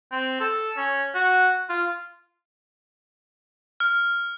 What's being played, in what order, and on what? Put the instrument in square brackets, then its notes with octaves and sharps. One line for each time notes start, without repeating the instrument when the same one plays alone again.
[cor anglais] C4
A4
C#4
F#4
F4
[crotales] F6